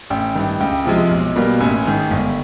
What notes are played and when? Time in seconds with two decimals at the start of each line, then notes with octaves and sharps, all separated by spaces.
0.10 A1 G5
0.35 G2 D#3
0.61 C#2 G5
0.85 C3 F3 G#3
1.11 B1
1.36 B2 G3 A#3
1.60 A1 G#5
1.85 G#2 D#3
2.11 G1